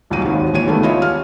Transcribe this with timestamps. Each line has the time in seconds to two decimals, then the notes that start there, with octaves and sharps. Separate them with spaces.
0.10 D#1 C#2 G#2 F#3 F#4 D#7
0.25 G#1 D#2 D#3
0.53 A#1 E3 C#5 D#7
0.67 C#2 D#3 G3 A3 B3
0.83 E4 F4 G4 C#5 D#5 E5
1.02 E2 C#5 F6